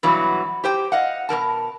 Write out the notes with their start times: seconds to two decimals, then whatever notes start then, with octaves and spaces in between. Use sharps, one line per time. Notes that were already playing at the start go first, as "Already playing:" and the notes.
0.03 G2 B2 E3 F#3 F#4
0.64 G4 C5 G5
0.92 D#5 F5 F#5
1.29 B2 F3 A#4 A5